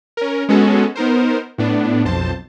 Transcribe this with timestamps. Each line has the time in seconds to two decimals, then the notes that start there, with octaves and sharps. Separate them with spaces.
0.17 C#4 A#4
0.49 G#3 B3 C#4 F#4 G#4 A4
0.95 B3 D#4 A#4 C5
1.58 A2 B3 D4
2.05 B1 F2 C5 A5